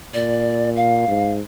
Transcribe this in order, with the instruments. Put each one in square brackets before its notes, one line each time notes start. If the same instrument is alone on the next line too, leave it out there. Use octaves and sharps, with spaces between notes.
[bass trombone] A#2 [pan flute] D5
[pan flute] F5
[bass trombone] G#2